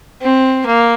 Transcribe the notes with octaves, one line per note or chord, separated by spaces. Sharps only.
C4
A#3